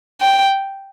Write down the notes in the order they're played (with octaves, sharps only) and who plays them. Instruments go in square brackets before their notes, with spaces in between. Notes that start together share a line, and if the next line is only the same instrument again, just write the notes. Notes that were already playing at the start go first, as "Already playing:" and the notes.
[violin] G5